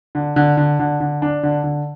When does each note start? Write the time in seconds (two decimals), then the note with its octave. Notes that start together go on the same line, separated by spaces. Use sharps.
0.15 D3
0.36 D3
0.57 D3
0.79 D3
1.00 D3
1.22 D4
1.43 D3
1.64 D3